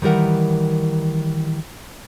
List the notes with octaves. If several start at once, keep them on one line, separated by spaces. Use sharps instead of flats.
D#3 E3 G3 A#4 F#5